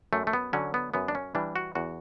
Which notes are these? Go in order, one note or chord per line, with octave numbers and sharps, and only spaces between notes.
F#2 A3
A3
B3
D3 F#3 C#4
B3
F#2 B3
D4
C#4
E3 G3 D4
F#4
E2 F#4